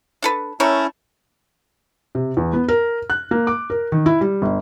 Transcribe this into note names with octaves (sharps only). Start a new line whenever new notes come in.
D4 A4 B4
A3 C#4 E4 A#4 C#5
C3
E2
B3
A#4
F#6
A#3
D6
A#4
D#3
E4
G3
G1